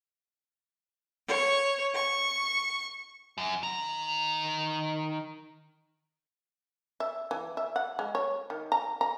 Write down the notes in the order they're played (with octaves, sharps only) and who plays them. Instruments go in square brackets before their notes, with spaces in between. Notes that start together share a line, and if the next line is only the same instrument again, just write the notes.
[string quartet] C#5
C#6
[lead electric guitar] F#2
D#3 A#5
[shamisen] E5
E3
E5
F#5
G#3
C#5
D#3
A#5
A#5